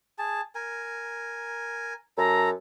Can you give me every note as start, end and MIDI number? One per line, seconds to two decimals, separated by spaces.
0.18 0.41 68
0.18 0.41 81
0.55 1.93 70
0.55 1.93 80
2.18 2.54 42
2.18 2.50 69
2.18 2.49 82